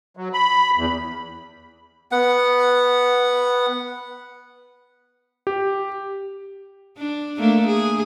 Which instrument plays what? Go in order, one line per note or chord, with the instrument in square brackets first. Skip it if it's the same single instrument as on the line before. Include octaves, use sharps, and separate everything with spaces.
[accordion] F#3
B5
E2
[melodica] B3 F#5
[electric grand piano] G4
[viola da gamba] D4
A3 A#3 D4
G#4